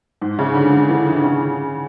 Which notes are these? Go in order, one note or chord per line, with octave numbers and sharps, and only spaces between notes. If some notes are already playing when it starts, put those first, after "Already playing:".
G#2
C#3
D3
D#3
E3
D#3
C#3